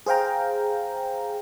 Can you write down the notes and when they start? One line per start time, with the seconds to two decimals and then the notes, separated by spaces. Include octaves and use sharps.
0.06 G#4 C5 F5 G5 A#5